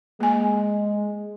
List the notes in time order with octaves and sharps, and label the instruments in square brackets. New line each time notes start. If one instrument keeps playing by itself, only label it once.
[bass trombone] G#3 [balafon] A#3 G#5